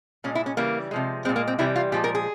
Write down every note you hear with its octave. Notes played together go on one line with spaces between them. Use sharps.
A#2 G#3 C#4
E4
C#4
C#3 E3 G3 A#3
C3 F3 G#3
A#2 G#3 C4
A#3
C4
C3 E3 G3 E4
F4
A#2 F3 G#3 G4
A#4
G#4